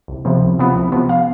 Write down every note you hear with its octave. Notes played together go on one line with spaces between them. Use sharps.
C2
C3 F3 B3
C2
C3 F3 B3
C2
C3 F3 B3
F5